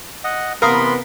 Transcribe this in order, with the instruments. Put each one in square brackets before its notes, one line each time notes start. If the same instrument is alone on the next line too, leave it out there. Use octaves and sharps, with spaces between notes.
[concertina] D#5 F#5
[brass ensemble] C3 E3 B3 [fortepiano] A#4 F5 D#6 [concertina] B5 C6